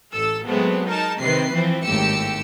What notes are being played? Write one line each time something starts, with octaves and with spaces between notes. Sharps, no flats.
A1 A4 E6
F#3 G#3 A3 B3 C4
D#4 A#4 A5
C3 D#3 C4 B4 C7
E3 F3 C4
G#1 D#2 A2 G4 E6 C#7